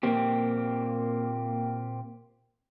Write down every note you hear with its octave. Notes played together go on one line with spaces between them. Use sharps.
A#2 A#3 C4 G4